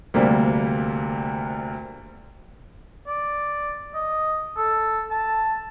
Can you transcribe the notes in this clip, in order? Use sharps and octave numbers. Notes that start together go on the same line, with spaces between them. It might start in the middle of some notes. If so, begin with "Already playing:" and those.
D2 C3 G3 A#3
D5
D#5
A4
A5